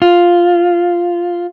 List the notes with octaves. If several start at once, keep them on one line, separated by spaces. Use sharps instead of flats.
F4